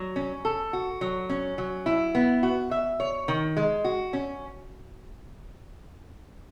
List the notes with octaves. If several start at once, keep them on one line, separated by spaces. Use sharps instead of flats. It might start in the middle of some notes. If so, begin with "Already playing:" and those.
Already playing: F#3
C#4
A4
F#4
F#3
C#4
F#3
E4
B3
F#4
E5
C#5
D#3
G#3
F#4
C#4